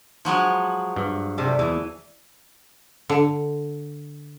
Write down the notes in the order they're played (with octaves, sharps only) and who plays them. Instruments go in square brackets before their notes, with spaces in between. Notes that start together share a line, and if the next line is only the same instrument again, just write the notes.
[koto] F3 F#3 G#3
[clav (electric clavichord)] G2
[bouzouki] C3 G3 A3
[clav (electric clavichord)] E2 [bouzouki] E3
[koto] D3